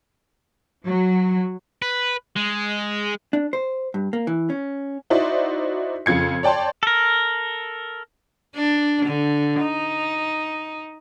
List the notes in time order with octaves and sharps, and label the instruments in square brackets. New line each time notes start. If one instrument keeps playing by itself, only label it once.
[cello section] F#3
[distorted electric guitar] B4
G#3
[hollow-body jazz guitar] D4
C5
G2
A#3
E3
C#4
[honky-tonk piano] D#4 E4 F#4 C5 D5
F2 C#3 F4 G#6 C#7
C#5 D5 G5 A5 C6
[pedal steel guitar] A4 A#4
[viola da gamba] D4
D3
D#4